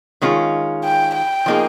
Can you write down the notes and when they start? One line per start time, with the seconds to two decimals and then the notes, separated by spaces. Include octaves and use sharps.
0.21 D#3 G#3 C#4 F4
0.84 G5
1.15 G5
1.46 F3 A#3 D#4 G#4